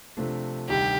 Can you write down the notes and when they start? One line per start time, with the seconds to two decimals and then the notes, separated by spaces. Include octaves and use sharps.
0.17 C3 F3 A3 D4
0.69 D2 C3 D#3 G3 G4